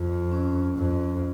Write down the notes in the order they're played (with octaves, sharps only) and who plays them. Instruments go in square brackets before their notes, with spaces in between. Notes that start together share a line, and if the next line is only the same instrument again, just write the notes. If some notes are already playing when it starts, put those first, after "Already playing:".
Already playing: [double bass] F2 [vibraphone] F4
[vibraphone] C#4
[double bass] F2